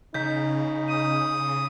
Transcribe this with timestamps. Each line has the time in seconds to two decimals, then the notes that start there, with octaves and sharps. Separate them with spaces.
0.14 C#3 D#4 G6 B6
0.89 D#6